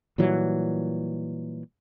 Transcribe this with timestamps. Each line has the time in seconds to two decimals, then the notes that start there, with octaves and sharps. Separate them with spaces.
0.18 A#2 E3 F#3 G3